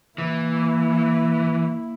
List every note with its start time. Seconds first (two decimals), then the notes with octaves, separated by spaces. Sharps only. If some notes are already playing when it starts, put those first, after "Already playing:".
0.18 E3 A#3 E4